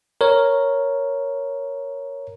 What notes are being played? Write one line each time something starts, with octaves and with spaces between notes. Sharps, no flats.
A#4 C#5